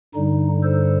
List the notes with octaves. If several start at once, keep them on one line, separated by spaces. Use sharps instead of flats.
G2 D3 G3 D#4
A4 C5